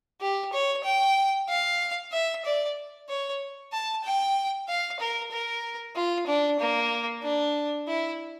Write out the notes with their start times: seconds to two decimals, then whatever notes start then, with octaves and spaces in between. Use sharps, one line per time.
0.21 G4
0.53 C#5
0.84 G5
1.48 F5
2.13 E5
2.45 D5
3.09 C#5
3.72 A5
4.04 G5
4.68 F5
5.00 A#4
5.32 A#4
5.96 F4
6.27 D4
6.60 A#3
7.23 D4
7.88 E4